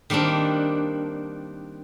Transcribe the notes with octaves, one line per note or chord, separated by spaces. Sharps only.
D#3 G3 A#3 C4 D4